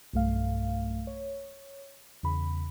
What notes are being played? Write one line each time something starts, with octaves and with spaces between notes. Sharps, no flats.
B1 G2 A3 F5
C#5
E2 C#3 B5